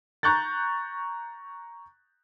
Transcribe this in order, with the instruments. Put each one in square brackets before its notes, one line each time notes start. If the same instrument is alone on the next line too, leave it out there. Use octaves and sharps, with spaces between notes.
[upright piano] A#5 C#6 F#6 G6 A6